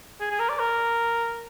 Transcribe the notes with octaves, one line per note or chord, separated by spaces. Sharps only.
G#4
G#4
A#4
D5
A#4